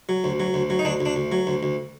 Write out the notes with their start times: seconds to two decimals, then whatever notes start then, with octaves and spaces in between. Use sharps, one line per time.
0.09 F#3
0.24 D2
0.40 F#3
0.54 D2
0.70 F#3
0.79 D#4
0.85 D2 D4
1.00 D2
1.06 D4
1.16 D2
1.32 F#3
1.47 D2
1.63 D2